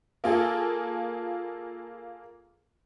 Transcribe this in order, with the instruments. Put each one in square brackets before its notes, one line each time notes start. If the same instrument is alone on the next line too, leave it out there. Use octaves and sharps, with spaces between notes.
[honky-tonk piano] A#3 F4 G#4 A4